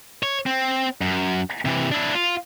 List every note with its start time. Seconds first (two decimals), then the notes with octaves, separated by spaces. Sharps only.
0.23 C#5
0.46 C4
1.01 F#2
1.65 C3 E3
1.91 D4 E4
2.14 F4